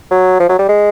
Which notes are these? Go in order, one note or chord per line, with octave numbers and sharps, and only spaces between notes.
F#3
F3
F#3
G3
G#3